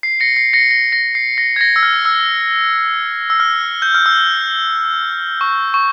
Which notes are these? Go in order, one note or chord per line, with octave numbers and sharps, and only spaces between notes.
C7
A#6 C#7
C7
A#6 C#7
A#6
A#6
C7
A#6
G#6
A#6
E6
F6
E6
E6
F6
G6
F6
E6
C#6
C#6